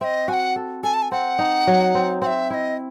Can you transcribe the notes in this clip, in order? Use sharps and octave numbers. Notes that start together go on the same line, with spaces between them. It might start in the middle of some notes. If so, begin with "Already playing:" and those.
C4 D#5 E5
F#4 G#5
F#5
A4
A4 G#5
A5
G#5
C4 F#5
D#4
F#3
C4
C4 F#5
E5
E4 D#5 E5